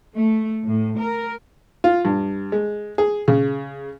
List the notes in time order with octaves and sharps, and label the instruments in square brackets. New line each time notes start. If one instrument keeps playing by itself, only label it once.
[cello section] A3
A2
A#4
[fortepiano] F4
G2
G#3
G#4
C#3